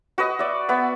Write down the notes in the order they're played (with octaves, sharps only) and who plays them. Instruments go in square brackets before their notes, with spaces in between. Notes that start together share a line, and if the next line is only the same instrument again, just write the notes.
[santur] F#4 B4 D#5
D5 E5
B3 E5